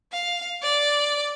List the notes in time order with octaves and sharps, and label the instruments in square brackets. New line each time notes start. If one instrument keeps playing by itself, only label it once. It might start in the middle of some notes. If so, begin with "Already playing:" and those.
[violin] F5
D5